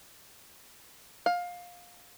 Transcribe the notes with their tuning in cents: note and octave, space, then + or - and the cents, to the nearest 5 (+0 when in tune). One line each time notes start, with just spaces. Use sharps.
F5 +20